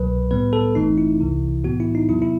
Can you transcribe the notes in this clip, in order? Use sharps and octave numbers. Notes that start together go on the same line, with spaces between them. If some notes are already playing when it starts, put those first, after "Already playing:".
Already playing: C2 B2 F#3 B4
A2 G3 B3 B4
A4
G1 F#2 E3 A3 C4 D#4
E4
C2 C3 E3
A2 E3 B3 F#4
E4
D#4
E2 C3 F#3 B3 E4
E4